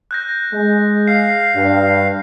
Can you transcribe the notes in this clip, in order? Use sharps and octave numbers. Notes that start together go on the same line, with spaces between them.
F#6 G6 A#6
G#3
F5 C7
G2